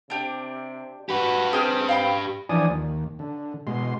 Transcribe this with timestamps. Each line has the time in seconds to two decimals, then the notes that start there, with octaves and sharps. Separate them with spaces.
0.10 C3 D4 G4
1.09 F#4 G4 B4
1.53 C4 G#4 G5 F6
1.89 F5 G5 B5
2.49 E3 F3 D4 D5 G#5 D#6
2.69 D#2
3.19 D3
3.67 B2 G#3 C6